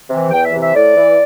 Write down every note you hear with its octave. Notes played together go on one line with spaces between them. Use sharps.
C3 E3
E2 G5
E5
C3 E3
E5
A2 D5
E3